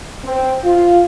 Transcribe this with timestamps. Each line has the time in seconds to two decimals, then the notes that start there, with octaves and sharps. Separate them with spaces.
0.24 C4
0.64 F4